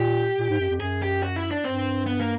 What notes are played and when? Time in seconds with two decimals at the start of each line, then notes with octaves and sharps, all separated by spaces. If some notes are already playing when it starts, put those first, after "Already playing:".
Already playing: A#2 G4
0.39 A#2
0.50 G#2
0.60 F#2
0.70 F2
0.80 F#2 G#4
1.02 G4
1.23 F#4
1.36 E4
1.51 D4
1.64 G2 C4
2.06 B3
2.21 A#3